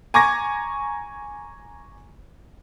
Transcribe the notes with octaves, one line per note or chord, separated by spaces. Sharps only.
G#5 A#5 C#6 D6 G#6 A#6